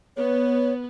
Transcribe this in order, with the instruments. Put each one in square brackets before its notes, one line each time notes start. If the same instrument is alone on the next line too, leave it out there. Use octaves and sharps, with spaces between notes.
[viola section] B3 [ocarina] C#5